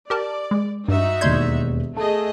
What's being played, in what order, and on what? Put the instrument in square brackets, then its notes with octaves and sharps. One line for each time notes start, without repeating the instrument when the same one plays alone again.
[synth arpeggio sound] G4 A#4 A5 [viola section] D5
[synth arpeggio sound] G#3
[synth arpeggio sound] G2 [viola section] D#4 F#4 E5
[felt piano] E1 D#2 D5 [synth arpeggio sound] C6 G6 G#6
[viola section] A3 G#4 D#5 [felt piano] A4 A5